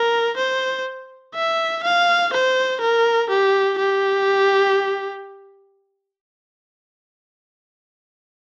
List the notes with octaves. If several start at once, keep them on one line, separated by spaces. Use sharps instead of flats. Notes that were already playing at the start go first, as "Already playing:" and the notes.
Already playing: A#4
C5
E5
F5
C5
A#4
G4
G4